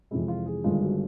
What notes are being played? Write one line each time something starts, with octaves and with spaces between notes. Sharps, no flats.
F2 C3 E3 G#3 E4
F4
G#4
G1 G2 D#3 G#3 F4
F#4